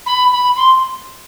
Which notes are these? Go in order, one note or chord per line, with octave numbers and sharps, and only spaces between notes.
B5
B5
C6